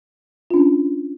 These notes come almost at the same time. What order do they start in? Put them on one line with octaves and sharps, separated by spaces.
F4 D4 C#4